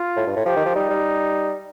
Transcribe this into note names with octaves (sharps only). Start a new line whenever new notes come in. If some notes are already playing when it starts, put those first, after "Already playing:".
Already playing: F4
A2
G2
A2
F3 G4
D#3
F3
G3 D#4
G3